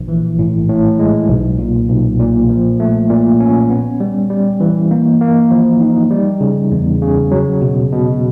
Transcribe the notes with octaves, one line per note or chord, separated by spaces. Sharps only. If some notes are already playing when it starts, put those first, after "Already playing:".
Already playing: A#1
E3
A2
A2
G#3
B1
A#2
B1
A#2
F3
A3
A#2
C#4
B3
G3
G3
E3
A#3
A#3
F3
D#4
G3
C#3
E2
C#3
F#3
B2
B2